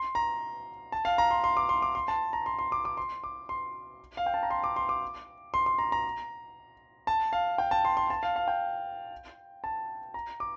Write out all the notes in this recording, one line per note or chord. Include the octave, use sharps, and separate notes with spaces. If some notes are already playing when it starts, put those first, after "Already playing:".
Already playing: C6
A#5
A5
F5
A#5
C6
C6
D6
C6
D6
C6
A5
A#5
C6
C6
D6
D6
C6
D6
C6
F5
G5
A5
A#5
C6
D6
C6
D6
C6
C6
A#5
A#5
A5
F5
G5
A5
C6
C6
A5
F5
F5
G5
A5
A#5
D6